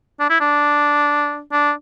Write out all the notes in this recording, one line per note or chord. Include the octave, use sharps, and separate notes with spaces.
D4
E4
D4
D4